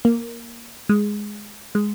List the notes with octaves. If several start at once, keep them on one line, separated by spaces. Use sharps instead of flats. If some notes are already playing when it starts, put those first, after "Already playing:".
A#3
G#3
G#3